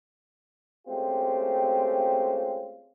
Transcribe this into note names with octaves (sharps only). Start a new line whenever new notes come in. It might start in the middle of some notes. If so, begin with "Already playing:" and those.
G#3 A3 C4 C#4 F4 G4